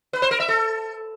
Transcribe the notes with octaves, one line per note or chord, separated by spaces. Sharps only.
B4
C5
A#4
E5
A4